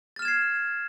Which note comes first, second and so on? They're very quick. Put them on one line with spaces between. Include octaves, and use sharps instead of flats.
A6 F6 E7 G#6 C7